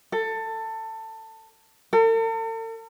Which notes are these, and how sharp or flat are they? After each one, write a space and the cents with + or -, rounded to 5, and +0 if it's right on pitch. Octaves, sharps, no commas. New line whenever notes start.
A4 +20
A4 +45